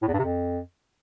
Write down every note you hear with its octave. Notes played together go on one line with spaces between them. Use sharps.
A2
E2
G2
C3
F2